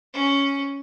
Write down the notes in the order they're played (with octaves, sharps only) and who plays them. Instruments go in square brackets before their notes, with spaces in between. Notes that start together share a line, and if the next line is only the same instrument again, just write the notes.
[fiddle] C#4